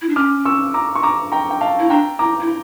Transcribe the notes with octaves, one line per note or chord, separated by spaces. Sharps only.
E4
D4
C#4 D6 F6
C#6 E6
A#5 D6
C#6
A#5 D6
G5 A#5
G5
F5 A5
E4
D4 G5 A#5
E4 A#5 D6
E4